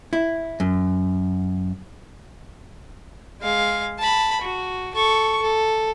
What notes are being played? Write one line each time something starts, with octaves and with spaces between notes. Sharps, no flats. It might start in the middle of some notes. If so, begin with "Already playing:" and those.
E4
F#2
G#3 F5
A5 B5
F#4
A4 C#6
A4